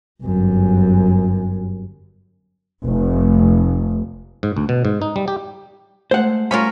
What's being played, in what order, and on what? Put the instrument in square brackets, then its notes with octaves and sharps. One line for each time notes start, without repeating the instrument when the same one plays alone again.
[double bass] G1 F#2
[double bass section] F1
[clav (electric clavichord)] G#2
D2
B2
G#2
D#4
G3
G4
[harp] G#3 A3 [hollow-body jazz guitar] C5 F#5
[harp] G3 A3 [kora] C#4 A#4 [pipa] F4 C#5 B5